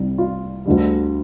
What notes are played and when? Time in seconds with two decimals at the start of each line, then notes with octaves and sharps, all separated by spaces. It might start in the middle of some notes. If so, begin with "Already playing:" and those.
Already playing: C2 C3 G3
0.18 F4
0.66 D2 D3 G3